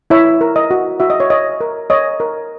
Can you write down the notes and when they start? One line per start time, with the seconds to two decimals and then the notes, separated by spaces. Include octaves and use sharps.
0.10 E4 C#5 E5
0.41 A#4
0.56 D#5
0.71 F#4
1.00 F#4 E5
1.10 D#5
1.20 C#5
1.30 C#5 D#5
1.61 A#4
1.90 C#5 D#5
2.20 A#4